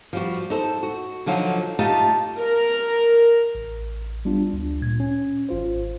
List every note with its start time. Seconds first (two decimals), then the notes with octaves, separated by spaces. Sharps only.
0.13 F3 G3 F#4
0.50 D#4 A4 C5
0.83 F#4
1.26 D3 F3 F#3 D#4 F4
1.79 A3 D#4 F4 G4 D#5 A5
2.40 A#4
3.55 A1
4.25 G3 B3 D4 F4
4.51 D2 D4
4.82 A#2 G#6
5.00 C#4
5.49 G#1 F4 C5